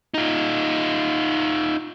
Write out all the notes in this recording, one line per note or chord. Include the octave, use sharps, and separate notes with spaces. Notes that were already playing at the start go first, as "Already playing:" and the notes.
D#4 F4